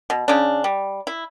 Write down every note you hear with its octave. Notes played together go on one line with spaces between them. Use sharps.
B2
C#3 D4
G3
E4